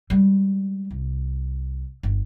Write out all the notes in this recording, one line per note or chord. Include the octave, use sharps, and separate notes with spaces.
G3 G#3
C2
G1